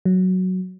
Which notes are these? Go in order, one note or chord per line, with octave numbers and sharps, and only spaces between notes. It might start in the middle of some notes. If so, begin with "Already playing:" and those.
F#3